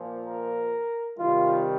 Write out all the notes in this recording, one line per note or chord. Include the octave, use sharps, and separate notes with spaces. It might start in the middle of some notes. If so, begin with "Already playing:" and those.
Already playing: A#2 F3
A#4
C3 D#3 G3 F4